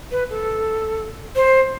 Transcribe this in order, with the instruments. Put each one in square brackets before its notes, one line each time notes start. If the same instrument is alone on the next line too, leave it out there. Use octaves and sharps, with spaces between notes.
[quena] B4
A4
C5